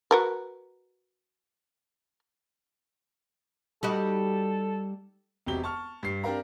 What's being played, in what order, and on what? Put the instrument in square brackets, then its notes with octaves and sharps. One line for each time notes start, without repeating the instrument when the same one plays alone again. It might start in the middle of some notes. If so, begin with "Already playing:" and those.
[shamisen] F#4 A#4 B4
[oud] G3 D#4 F#4 [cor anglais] A4
[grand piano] E1 C3 F#4 G4 G7
A5 C#6 F6
G2 C7
C4 D4 G4 A#4 F5 A#5